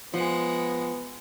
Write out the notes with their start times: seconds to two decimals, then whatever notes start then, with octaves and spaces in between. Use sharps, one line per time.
0.14 F3 G#3 B3 F#5